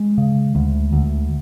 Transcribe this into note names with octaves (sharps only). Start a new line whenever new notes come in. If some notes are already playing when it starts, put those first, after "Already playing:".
Already playing: G#3
C#3
D2
D2